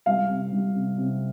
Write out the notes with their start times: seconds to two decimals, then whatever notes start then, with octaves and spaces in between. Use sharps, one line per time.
0.06 G3 F5
0.29 C3
0.53 G3
0.75 C3
0.98 C3